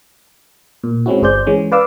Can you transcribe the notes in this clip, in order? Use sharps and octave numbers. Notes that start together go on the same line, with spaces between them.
A#2
G#3 C4 C#4 E4 F#4
G1 G#4 C5 D5 G6
E3 G#3 C#4
B4 D5 F5 D6 E6